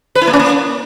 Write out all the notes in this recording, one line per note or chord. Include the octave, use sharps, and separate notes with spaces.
B4
E4
A#3
C#4
A#3